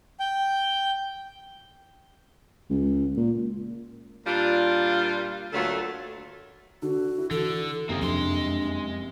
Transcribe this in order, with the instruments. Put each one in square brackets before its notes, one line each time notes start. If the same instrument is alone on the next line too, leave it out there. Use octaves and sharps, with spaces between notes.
[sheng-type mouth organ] G5
[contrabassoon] C#2
A#2
[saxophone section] A#2 G3 D4 F4
D2 A#2 F#3 A3 F4 A4
[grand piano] D3 [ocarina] F#4
[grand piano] E4
[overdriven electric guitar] D3 [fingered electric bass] E3 [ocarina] A4
[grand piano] F#1 C3 D#6 [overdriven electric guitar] D#3 A#3
[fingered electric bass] F2 [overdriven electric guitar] G#3 C6 [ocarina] D4